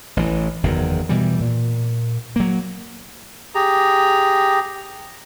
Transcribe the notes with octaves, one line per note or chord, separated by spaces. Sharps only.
A1 E3
F#1 E2 D#3
B2 E3 G3
A#2
F#3 A#3
G4 G#4 A#5